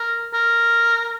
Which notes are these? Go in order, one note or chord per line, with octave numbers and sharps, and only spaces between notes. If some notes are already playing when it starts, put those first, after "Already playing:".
Already playing: A#4
A#4